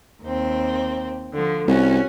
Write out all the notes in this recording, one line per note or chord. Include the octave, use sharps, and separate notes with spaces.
D#2 C4
D3 F3
C2 C#4 F#4